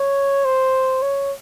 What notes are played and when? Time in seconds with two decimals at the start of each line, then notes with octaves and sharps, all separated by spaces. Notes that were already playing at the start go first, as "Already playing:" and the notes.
Already playing: C#5
0.45 C5
1.02 C#5